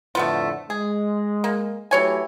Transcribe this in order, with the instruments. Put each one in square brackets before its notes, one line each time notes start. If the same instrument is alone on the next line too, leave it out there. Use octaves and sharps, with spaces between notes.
[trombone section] F2 A2 D3 [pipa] A3 B3 F4
[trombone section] G#3 [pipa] G#4
[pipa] A#3
[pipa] E3 C#5 G#5 [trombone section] F#3 A3 G4